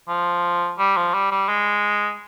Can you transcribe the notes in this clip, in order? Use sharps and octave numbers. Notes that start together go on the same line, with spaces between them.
F3
G3
F3
G3
G3
G#3